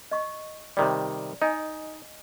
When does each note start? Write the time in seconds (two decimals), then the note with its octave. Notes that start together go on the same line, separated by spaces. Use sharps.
0.11 D#5 C#6
0.77 C3 D#3 G3 D5
1.42 D#4 D#5 G#5